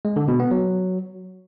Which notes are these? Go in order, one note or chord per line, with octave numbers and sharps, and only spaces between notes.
G#3
D3
B2
B3
F#3